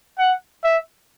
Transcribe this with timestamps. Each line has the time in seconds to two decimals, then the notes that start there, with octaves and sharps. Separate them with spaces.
0.18 F#5
0.64 E5